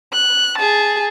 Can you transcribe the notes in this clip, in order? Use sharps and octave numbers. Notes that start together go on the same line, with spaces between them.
F#6
G#4 A5